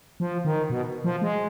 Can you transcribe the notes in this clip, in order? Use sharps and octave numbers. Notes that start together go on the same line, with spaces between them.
F3
D#3
B2
F3
G#3